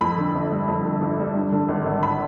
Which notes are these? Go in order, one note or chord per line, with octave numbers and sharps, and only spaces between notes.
F2 B5
D3
G1
G3
F2
D3
G1
G3
G2
D3
G#1
G#1
B5